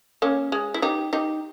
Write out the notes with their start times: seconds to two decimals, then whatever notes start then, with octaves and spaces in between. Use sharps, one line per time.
0.22 A#3 C#4
0.52 G#3
0.74 E4
0.82 D#4 G4
1.13 D#4 G4